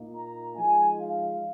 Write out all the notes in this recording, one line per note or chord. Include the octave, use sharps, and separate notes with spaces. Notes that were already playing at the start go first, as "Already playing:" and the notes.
Already playing: A#2 A#3 D#4
A#5
F3 G#3 D#4 G#5
F5